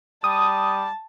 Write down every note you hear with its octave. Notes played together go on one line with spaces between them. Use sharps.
G3 A5 D#6